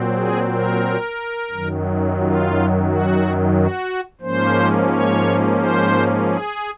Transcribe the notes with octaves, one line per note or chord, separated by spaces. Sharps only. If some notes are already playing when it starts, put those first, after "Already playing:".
Already playing: A#2 F#3 C4
G#4
A#4
F#2 D#3 F#3
F4
F#4
F#4
G#2 F3 A#3 C#4 C5
C#5
C5
G#4